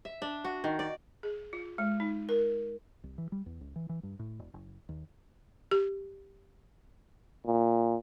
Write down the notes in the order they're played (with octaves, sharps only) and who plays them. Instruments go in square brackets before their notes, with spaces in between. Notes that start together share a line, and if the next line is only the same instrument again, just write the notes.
[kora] E5
D4
F#4
D#3
D5
[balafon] G#4
F4
G#3
D#4
A#4
[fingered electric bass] C2
E3
G3
E2
C#2
E3
E3
G2
A2
E1
F#1
D#2
[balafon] G4
[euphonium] A#2